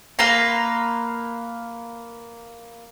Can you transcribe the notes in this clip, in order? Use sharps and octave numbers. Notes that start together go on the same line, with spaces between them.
A#3 B4 A#5 C6